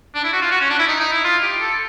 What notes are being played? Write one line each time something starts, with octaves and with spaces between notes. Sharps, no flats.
D4
E4
F#4
F4
F#4
C#4
D4
E4
D#4
D#4
E4
F4
G4
A4